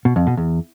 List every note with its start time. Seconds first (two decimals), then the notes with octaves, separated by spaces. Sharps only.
0.05 B2
0.16 F2
0.27 B2
0.37 E2